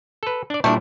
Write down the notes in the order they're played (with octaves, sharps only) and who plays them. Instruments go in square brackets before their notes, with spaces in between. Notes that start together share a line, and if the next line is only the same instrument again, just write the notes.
[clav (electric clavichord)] A4 B4
D4 D5
[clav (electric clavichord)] A#2 G3 E4 [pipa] A3 D4